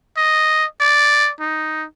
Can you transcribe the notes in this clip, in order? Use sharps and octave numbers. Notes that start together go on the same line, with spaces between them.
D#5
D5
D#4